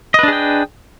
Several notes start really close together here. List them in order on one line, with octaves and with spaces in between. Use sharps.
D#5 B4 D4 G#4 G5